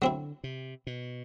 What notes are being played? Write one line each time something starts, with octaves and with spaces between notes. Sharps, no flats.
D3 F#3 C4 E4
C3
B2